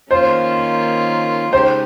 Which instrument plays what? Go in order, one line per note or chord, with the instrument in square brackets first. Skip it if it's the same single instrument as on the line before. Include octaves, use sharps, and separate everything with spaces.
[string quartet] D#3 A#3 C#4 F4 [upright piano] C5
[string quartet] C#3 G#3 D#4 G4 [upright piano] C5